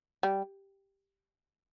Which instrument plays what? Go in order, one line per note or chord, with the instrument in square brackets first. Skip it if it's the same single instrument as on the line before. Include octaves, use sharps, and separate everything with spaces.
[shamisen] G3